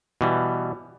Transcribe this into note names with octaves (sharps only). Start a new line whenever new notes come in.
B2 E3 G3